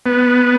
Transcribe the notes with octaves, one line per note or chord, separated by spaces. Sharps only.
B3